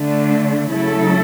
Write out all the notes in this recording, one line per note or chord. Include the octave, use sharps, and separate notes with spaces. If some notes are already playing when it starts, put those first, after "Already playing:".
Already playing: D3 A3 D4
C#3 F#3 A3 E4 A4